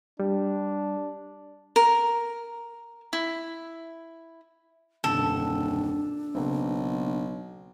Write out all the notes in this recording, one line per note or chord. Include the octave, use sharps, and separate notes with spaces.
G3 D4
A#4
E4
D#1 F#2 B2 D3 D4 A4
B1 C#3 A#3 C4